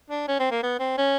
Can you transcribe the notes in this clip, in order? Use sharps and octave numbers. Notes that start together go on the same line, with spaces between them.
D4
C#4
C4
A#3
B3
C4
C#4